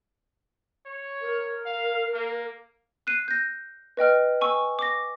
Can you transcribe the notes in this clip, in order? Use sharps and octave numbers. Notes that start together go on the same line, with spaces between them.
C#5
A#4
F5
A#3
F#6 C7 D#7
G6 A#6
B4 D#5 G5 F6
G#5 C#6 E6
D6 A#6